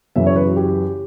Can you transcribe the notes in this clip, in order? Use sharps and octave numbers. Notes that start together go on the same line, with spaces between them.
F#2 C#3 E3 E5
C#5
B4
F#4
G4